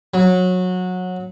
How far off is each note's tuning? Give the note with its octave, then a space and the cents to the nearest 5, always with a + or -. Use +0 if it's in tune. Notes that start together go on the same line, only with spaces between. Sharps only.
F#3 -20